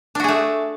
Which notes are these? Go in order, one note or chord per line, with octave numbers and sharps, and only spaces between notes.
A3 D4 F#4 G#4